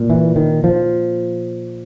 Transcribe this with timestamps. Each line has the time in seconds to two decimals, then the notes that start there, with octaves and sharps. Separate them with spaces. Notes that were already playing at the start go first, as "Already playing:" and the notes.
Already playing: A#2
0.10 E3
0.36 D#3
0.64 F3